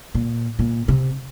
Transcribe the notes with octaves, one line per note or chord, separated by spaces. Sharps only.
A#2
A#2
C3